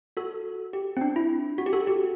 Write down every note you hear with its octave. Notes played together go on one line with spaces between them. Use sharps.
F#4 A4
G4
C4
D4
E4
F#4
G4
F#4 A4
G4